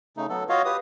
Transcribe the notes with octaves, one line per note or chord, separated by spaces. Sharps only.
C#3 A3 D#4
F#3 B3 A4
F4 F#4 C#5 D#5 F5
G4 B4 D#6